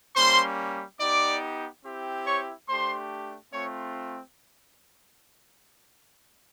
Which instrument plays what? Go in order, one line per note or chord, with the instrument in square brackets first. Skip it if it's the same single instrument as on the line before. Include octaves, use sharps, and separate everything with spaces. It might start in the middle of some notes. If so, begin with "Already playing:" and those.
[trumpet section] G3 A#3 C#4 C5 C6
B3 D#4 G4 D5 D6
C4 E4 G4
C#5 C#6
A3 D4 G4 C5 C6
A3 C4 F4 C#5 C#6